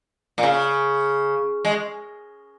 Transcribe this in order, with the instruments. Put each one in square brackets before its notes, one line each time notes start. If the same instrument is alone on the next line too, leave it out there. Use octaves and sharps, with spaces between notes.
[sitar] A#2
C#3
G#3